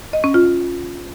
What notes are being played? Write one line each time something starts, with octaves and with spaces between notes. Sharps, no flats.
D#5
C#4
F4